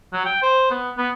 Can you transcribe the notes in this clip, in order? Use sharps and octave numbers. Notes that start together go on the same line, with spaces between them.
F#3
G5
C5
B3
B3